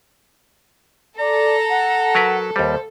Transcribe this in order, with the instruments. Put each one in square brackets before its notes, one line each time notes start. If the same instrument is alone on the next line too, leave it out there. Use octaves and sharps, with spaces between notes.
[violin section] A4 [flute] D5 [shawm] A#5
[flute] F#5
[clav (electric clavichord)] F#3 A#4 B4
[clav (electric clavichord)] D#2 G3 [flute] C5